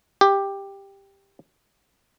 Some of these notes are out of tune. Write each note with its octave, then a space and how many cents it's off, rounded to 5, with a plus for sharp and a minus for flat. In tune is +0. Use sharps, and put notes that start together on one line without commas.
G4 +10